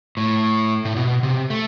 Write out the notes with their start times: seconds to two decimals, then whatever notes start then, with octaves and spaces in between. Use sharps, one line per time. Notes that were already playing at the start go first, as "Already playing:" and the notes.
0.17 A2
0.85 A2
0.96 B2
1.23 C3
1.50 A3